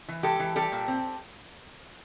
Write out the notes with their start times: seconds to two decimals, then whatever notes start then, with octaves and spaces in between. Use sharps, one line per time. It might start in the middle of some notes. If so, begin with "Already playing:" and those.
0.08 E3
0.23 G#3 G4 A4
0.40 E3
0.56 G3 G4 A4
0.72 A#2
0.88 C4